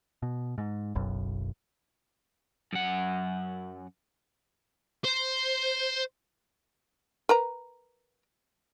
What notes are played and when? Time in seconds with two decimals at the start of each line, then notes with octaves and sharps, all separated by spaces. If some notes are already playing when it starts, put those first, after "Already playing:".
0.23 B2
0.58 G#2
0.95 F#1 B1 F#2
2.73 F#2 F#5
5.05 C5
7.29 A#4 B4 A#5